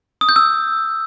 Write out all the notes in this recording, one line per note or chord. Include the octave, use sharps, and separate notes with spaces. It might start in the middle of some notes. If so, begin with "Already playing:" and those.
D#6
G6
E6